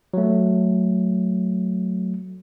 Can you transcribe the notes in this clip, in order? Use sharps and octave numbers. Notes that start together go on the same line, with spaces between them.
F#3 A3